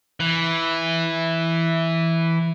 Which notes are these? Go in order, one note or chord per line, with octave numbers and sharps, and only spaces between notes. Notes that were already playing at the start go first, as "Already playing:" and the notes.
E3